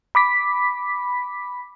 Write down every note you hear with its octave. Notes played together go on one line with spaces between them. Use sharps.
B5 D6 B6